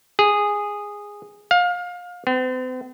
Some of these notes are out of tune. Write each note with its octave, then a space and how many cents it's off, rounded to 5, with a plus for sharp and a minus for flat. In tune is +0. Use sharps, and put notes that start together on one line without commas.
G#4 -10
F5 +25
C4 -45